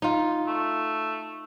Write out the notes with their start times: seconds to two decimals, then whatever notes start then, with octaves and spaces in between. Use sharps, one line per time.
0.02 D#4 F4
0.47 A3